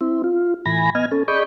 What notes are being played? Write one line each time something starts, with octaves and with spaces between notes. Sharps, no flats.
C4 E4
F4
A2 E3 G#5 B5 A#6
B3 D#5 F6 G#6
C#4 A4
G#4 D5 D#5 B5 C#6 G6